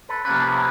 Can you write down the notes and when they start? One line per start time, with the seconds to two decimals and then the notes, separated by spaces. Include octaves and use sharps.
0.09 A4 B4
0.25 C3 F3 A#3 C#4 A4 B4